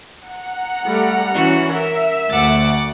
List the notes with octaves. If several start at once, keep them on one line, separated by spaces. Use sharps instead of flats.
F#5 A#5
G3 A3
E3 C#4 E4 F#4
A#4 E5
D2 F#5 D6 A6